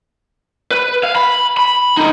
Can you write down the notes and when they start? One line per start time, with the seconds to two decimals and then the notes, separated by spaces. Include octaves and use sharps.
0.71 B4
1.03 F5
1.16 B5
1.57 B5
1.97 D3 D#4